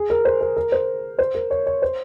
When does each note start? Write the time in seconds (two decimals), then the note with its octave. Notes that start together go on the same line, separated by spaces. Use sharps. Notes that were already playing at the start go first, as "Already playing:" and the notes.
Already playing: G#4
0.10 A#4
0.25 C5
0.41 A#4
0.56 A#4
0.72 C5
1.19 C5
1.35 A#4
1.51 C#5
1.66 C#5
1.82 C5